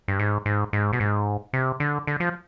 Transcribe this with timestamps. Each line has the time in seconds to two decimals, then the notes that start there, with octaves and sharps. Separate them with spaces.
0.08 G2
0.19 G#2
0.46 G#2
0.73 G#2
0.93 B2
1.00 G#2
1.53 C3
1.80 D3
2.07 D3
2.20 F3